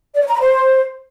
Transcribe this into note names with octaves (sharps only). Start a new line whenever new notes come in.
D5
C#5
A#5
B5
C5